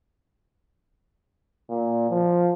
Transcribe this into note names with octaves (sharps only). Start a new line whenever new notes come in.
A#2
F3